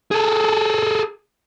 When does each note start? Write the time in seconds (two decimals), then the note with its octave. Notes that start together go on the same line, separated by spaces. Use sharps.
0.12 G#4 A4